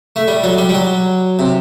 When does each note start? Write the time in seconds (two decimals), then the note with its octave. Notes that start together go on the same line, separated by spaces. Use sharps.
0.16 A3
0.28 G3
0.43 F#3
0.58 G3
0.69 G3
0.74 F#3
1.39 C3